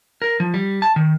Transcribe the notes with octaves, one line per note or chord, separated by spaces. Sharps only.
A#4
F3
G3
A5
D#3